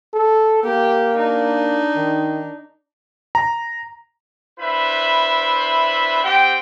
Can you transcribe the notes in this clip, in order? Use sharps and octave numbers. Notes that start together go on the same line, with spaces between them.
A4
A#3 G4
D4 D#4
D#3
A#5
D4 E4 B4 C5 E5 B5
C4 G4 F#5 G5